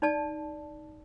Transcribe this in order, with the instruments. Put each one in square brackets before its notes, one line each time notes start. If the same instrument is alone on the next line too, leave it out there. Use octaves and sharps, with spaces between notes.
[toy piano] D#4 D5 A5